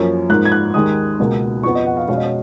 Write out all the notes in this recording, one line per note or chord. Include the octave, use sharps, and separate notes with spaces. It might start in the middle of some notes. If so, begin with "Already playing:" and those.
Already playing: F#2 F3 A#3 C#4
G#2 F3 A#3 F#6
G#6
F#6
D#2 D#3 G#3 D#6
C#2 B2 A#3
F2 F3 B3 C#6
D#5
F#5
F5
B2 G#3 C#4 F5
D#5
C#5